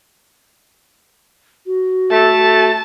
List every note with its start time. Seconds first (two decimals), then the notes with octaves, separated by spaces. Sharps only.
1.66 F#4
2.11 A3 A5